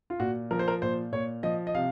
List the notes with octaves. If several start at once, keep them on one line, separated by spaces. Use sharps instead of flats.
F4
A#2 F#4
F3 A#4
C5
A#4
A#2 C5
A#2 C#5
F3 D#5
D#5
C3 F5